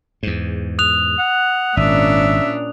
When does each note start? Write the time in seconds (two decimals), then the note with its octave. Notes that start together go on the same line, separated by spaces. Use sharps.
0.23 E2 G#2
0.79 D#6 F#6 F7
1.19 F#5
1.77 G#1 A#2 C#4 D4 E5